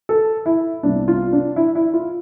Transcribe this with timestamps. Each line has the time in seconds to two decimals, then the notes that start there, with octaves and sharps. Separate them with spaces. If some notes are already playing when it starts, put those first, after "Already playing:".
0.09 A4
0.46 E4
0.83 C2 C3 G3 B3 D4
1.08 F4
1.33 D4
1.56 E4
1.75 E4
1.94 F4